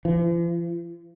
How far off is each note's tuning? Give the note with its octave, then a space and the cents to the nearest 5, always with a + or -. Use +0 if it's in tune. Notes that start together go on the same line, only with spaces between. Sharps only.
F3 -45